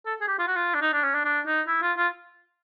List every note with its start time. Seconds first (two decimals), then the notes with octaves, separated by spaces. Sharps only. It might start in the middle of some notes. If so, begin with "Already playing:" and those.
0.06 A4
0.21 G#4
0.28 G4
0.39 F4
0.48 F#4
0.56 F4
0.74 D4
0.82 D#4
0.93 D4
1.04 C#4
1.14 D4
1.25 D4
1.47 D#4
1.68 E4
1.82 F4
1.97 F4